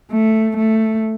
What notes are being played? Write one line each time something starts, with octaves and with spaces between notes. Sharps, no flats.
A3
A3